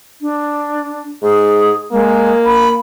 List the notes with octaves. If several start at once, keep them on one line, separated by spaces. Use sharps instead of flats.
D4
G#2 G#4
G#3 A#3
B5